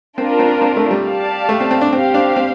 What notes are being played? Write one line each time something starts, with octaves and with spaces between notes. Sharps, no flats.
C4 D4 F4 A#4
C4
C4
A3
G3
G4 D5 F5 A5
A3
C4
C4
D4
C4 G4 C5 F5
D4
C4